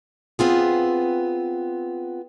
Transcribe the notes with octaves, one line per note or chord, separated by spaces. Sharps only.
B3 C4 F4 G#4